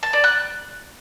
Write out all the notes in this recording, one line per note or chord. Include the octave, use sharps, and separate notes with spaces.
A5
D5
F#6